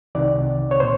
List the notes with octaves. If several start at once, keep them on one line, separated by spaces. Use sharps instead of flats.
C2 C3 D#3 D5
C#5
A#2 C5